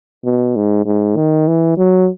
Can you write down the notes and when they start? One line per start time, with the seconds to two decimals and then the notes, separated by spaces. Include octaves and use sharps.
0.25 B2
0.56 G#2
0.86 G#2
1.16 D#3
1.48 E3
1.77 F#3